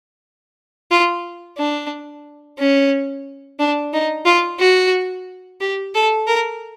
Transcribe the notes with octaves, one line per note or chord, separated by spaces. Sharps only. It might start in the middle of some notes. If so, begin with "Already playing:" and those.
F4
D4
C#4
D4
D#4
F4
F#4
G4
A4
A#4